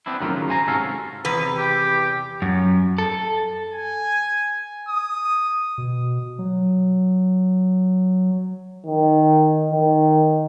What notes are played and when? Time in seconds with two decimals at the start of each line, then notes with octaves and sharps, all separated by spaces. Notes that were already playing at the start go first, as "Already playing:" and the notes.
0.06 B3 C4 D4 E4
0.21 F#2 A2 D#3 F#3 F4
0.34 C#3
0.49 C5 G#5 A#5
0.67 G#2 C3 C#4 F#4 A4 F5
1.25 E2 C3 B4
1.57 G4
2.42 F#2
2.98 A4
3.71 G#5
4.88 D#6
5.78 B2
6.39 F#3
8.86 D#3
9.72 D#3